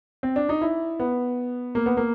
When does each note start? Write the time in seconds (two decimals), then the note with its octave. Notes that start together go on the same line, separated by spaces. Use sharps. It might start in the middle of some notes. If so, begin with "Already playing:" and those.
0.23 C4
0.36 D4
0.49 D#4
0.61 E4
1.00 B3
1.75 A#3
1.86 B3
1.97 A#3